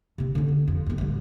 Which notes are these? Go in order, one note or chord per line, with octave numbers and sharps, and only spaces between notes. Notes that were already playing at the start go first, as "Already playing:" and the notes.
C3 C4
D3 C#4
C4
F2
G1 G2
A1 G3